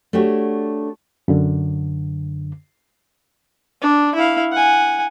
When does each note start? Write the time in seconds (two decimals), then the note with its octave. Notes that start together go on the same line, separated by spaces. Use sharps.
0.13 A3 D4 F#4 G4 C#5
1.28 F#2 D3
3.81 D4
4.15 E4 F5
4.53 F#5 G#5